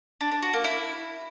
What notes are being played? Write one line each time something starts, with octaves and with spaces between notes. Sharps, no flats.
D4
D4
F#4
A#3
E4